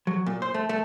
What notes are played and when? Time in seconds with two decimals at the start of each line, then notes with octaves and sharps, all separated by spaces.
0.07 F#3
0.26 A#2
0.42 C5
0.54 A3
0.69 A3